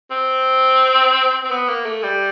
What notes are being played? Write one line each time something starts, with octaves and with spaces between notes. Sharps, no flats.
C4
C4
B3
A#3
A3
G3